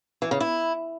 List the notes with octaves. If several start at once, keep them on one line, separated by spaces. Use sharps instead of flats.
E3
C#3
E4